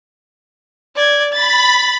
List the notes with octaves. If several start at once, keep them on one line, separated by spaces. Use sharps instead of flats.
D5 G#6
B5 A6